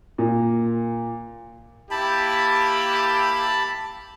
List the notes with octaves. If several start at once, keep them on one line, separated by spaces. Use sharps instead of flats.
A#2
A#3 E4 G4 A5 B5